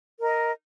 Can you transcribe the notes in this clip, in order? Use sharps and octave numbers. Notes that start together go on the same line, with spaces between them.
A#4 D#5